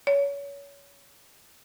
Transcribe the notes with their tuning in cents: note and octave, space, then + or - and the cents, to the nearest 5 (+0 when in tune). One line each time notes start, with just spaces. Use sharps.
C#5 +25